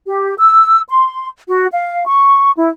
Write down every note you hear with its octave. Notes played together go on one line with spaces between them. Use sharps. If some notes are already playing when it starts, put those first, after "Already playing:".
G4
E6
C6
F#4
F5
C#6
E4